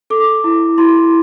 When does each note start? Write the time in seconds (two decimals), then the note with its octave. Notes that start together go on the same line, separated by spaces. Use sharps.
0.10 A4 D6
0.44 E4
0.78 E4 C6